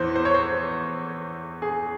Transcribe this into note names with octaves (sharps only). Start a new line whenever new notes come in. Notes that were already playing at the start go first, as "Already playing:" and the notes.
Already playing: E2 E3 C5
C5
C#5
C5
G#4